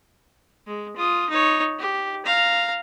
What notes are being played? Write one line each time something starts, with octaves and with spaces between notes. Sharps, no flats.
G#3
F4 D#6
D#4 C#5
G4
F5 A#5